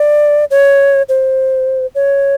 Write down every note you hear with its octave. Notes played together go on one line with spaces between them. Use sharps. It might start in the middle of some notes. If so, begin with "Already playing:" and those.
Already playing: D5
C#5
C5
C#5